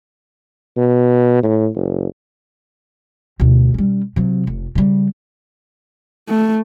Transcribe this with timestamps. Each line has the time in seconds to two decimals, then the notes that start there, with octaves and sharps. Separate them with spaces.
0.77 B2
1.43 A2
1.75 F#1
3.40 D2 B2
3.74 G3 C#4
4.16 C3 F#3
4.47 F1
4.75 C#3 G3
6.29 A3